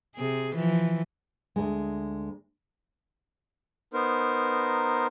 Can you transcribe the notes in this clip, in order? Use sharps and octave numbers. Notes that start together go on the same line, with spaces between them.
C3 G#4
E3 F3
D2 G#3
B3 D#4 A#4 C5